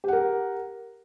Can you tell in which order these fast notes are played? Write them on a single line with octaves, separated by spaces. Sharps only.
G4 F#5 A#4